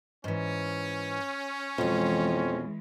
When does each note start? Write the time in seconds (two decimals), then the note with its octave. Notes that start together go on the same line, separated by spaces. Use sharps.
0.24 G#2 E3 C#4
1.78 F2 B2 E3 G#3 F4